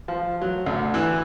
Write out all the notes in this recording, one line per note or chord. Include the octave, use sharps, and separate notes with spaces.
F3
F#3
D2
E3